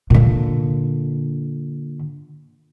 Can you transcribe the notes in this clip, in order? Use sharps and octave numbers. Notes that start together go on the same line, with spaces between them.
A#2 D3